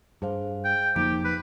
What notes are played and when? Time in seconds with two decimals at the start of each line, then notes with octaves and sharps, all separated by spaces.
0.22 G2 G#4 C5 F5
0.64 G5
0.96 F1 F3 A#3 D#4 G4 D6 D7
1.24 B4